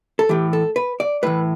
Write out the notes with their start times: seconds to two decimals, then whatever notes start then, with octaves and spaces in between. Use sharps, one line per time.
0.19 A4
0.29 A2 E3 G4
0.53 A4
0.76 B4
1.00 D5
1.23 A2 E3 B4